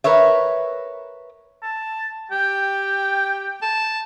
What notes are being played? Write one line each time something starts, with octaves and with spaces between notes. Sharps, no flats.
A#4 B4 C#5 E5
A5
G4 G5
A5